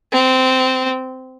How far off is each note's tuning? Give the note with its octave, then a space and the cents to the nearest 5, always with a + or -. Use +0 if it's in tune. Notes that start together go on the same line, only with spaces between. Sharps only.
C4 -15